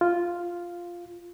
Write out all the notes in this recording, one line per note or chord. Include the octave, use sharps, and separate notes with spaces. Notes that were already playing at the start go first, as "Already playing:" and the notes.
F4